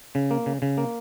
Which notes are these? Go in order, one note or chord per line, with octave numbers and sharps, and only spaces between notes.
C#3
A#3
C#3
C#3
A#3